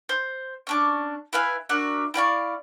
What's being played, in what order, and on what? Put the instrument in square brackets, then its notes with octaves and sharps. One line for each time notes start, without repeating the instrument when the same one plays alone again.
[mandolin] C5
C#4 D4 D6
E4 B4 F5 G#5
D4 F#4 A#4 E5
E4 D5 F5 C#6